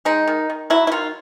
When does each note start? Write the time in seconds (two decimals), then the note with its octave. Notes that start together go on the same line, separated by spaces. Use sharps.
0.05 G#3 D#4
0.27 D#3
0.50 D#3
0.70 F#3 E4
0.87 E4
0.92 D#3 F4